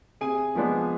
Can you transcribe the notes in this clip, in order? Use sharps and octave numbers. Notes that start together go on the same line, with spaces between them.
C3 G#4 G#5
F3 G#3 B3 D4